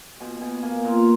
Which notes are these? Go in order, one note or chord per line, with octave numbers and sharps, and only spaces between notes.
B2 G#5
B2 G#5
A#3 G#5
A#2 A#5